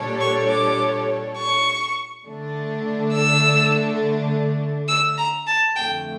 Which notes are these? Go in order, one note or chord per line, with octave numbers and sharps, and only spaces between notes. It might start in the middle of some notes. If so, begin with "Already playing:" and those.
Already playing: A#2 G3 D4 A4 C#5
C#6
D6
C#6
D3 A3 D4
E6
E6
A#5
A5
F2 D3 A3 G5